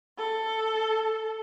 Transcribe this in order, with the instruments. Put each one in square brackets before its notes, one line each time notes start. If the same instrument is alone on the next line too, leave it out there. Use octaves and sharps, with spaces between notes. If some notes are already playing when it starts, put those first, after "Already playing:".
[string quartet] A4